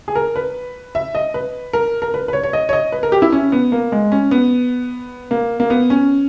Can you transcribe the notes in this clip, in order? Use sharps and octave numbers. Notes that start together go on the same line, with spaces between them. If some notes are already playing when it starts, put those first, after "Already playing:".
G#4
A#4
B4
E5
D#5
B4
A#4
A#4
B4
B4
C#5
C#5
D#5
C#5
D#5
B4
A#4
G4
E4
C#4
B3
A#3
G#3
C#4
B3
A#3
A#3
B3
C#4